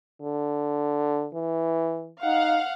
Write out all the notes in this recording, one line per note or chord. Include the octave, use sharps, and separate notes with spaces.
D3
E3
D#4 F5 F#5